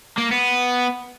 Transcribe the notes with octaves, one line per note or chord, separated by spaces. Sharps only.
A#3
B3